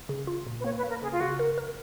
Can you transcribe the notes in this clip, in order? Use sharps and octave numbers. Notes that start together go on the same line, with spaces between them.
C#3
F4
A#2
B4
A#3 C#5
B4
A#3
A#4
C#3 G#4
F4
C#3 F#4
A#4
A#4